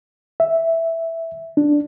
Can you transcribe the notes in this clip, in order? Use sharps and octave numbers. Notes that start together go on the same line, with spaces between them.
E5
D4